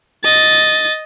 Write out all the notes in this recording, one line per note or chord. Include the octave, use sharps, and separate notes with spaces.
D#5 A6